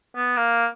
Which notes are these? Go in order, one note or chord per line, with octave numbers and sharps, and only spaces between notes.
B3
A#3